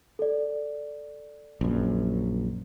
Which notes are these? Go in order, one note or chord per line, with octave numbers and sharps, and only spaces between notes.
A4 D5
A#1 F#2